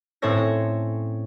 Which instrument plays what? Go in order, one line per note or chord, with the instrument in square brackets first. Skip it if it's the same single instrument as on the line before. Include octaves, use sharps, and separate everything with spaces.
[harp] A2 C4 C#4 A4 C#5 A#6